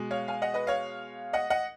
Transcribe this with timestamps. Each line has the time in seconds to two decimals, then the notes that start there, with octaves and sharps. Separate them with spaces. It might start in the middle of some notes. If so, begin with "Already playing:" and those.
Already playing: B2 G#3
0.11 C#5 F5
0.28 F5 G#5
0.42 D#5 F#5
0.54 B4 D#5
0.67 C#5 F5
1.33 D#5 F#5
1.50 D#5 F#5